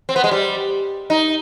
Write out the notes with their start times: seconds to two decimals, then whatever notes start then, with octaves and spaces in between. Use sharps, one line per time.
0.09 C4
0.16 B3
0.24 G#3
0.31 G3
1.10 D#4